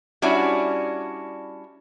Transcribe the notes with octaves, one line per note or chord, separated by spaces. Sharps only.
G3 C#4 D4 E4 F#4